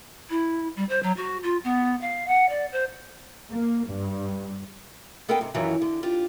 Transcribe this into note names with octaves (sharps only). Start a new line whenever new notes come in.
E4
G3
C5
F#3
F#4
F4
B3
F5
F#5
D5
C5
A#3
G2
B3 A4 A#4 D#5 F5 G5
G#2 C3
F#2 D#3 E3 F#3 F4
D3
D4 F4 G4